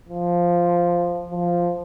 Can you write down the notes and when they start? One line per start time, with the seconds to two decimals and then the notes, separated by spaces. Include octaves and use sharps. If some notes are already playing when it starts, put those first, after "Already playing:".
0.09 F3
1.31 F3